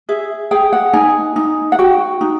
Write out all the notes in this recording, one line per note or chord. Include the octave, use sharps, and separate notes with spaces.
G#4 E5
G#4 G5
F#5
D#4 G#5
D#4
F#5
F#4 G5
D#4